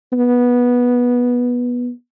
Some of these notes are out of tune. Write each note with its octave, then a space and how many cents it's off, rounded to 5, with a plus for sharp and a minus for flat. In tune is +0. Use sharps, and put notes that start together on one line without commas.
B3 -15